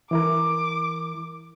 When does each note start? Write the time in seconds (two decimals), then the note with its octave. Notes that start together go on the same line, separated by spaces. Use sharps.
0.11 E3 E4 A#4 D6